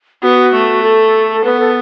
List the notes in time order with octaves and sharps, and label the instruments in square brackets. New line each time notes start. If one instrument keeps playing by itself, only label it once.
[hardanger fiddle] B3 [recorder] F#4
[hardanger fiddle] A3
[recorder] A4
A4
[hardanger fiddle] B3 [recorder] B4
[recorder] A4